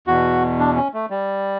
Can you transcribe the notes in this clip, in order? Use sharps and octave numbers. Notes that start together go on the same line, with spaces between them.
E2 B2 F#4
D4
C#4
A3
G3